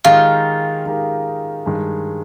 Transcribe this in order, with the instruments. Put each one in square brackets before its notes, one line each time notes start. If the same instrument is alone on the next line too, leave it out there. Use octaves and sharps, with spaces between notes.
[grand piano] D#3 G#3 D#4 G4 A#4 [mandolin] F4
[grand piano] D#3 G#3 D#4 G4 A#4
G2 D#3 G#3